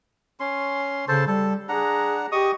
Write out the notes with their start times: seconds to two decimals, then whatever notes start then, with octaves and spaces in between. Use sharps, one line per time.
0.40 C#4 C6
1.08 C#3 A4 C5 A5
1.28 G3 A4
1.69 D4 G#4 F#5 A#5
2.32 G4 D#5 C#6 D#6